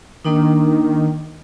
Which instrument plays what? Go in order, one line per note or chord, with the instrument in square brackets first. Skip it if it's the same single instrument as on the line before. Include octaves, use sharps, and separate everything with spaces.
[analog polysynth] D#3 [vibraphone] A#3 D4 D#4